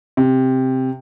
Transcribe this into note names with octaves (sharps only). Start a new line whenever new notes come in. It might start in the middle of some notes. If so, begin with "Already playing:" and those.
C3